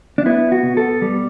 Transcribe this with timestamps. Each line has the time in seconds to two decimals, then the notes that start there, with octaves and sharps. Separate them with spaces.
0.18 D4
0.26 B3 E4
0.52 F#4
0.63 B2
0.77 A4
1.02 G3